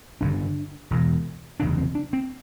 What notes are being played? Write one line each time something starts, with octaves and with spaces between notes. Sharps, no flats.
G1 F#2 D3 D4
E1 E2 B2
F#1 E2 C3 D4
C4
D4
C4